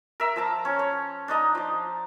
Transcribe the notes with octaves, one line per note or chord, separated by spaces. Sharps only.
A#4 E5
F3 A5 A#5
C#4
C#5
D4 D#4 D#5 A#5
F3 D5